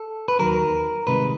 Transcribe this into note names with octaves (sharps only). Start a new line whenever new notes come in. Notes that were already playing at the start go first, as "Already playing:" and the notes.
Already playing: A4
B4
D#2 D#3 F#3 A#4
C2 C3 D#3 G#3 B4